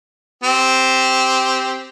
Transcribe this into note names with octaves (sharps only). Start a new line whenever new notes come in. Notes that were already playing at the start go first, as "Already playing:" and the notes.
C4 G4